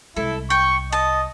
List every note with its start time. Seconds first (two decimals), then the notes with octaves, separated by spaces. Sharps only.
0.17 C2 G#3 E4 A4
0.50 G5 C#6
0.92 D#5 A5